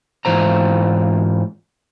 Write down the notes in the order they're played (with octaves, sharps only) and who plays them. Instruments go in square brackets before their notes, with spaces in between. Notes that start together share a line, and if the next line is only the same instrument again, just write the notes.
[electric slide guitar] G#2 E3 F4 C5 A#5